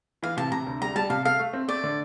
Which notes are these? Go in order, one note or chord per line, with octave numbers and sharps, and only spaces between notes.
E3 F5
C3 A5
C3 A#5
D2
G3 A#5
G3 A5
C3 F5
A4 F5
A3
C4
A3 D5
D3